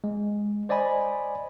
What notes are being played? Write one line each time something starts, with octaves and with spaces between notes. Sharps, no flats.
G#3
C5 D5 D#5 G#5 B5